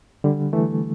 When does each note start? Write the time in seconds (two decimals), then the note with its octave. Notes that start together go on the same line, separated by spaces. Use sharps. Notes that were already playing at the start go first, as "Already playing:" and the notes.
0.24 D3 G3
0.53 E3 A3